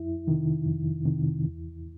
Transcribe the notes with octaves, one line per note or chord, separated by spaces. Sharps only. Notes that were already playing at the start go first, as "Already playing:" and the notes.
Already playing: F2 E4
C3 D#3
F2
C3 D#3
E2